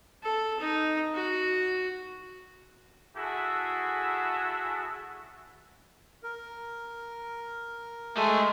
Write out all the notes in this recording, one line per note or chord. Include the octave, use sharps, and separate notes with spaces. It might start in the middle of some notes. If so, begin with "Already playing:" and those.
A4
D#4
F#4
E4 F#4 G#4 A4 E5
A#4
G#3 A3 G4 G#5